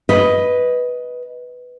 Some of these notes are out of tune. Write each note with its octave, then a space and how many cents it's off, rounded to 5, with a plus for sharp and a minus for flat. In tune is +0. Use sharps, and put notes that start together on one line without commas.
B4 +0 D#5 +10